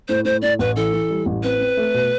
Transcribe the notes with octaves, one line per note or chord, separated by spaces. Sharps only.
A2 C5
A2 C5
A2 D5
A1 B4
E3 A4
E3
G3
A1
C4 B4
C4
A3
B2